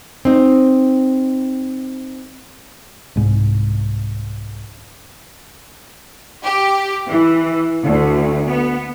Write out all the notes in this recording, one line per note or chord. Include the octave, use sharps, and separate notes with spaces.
C4 D#4
C2 G#2
G4
E3
D2
B3